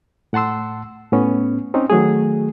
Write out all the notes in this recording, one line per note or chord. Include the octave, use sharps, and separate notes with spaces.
A2 F#5 A5 C6 E6
A2 B3 C#4
C4 C#4 D#4
D#3 F#3 A3 G#4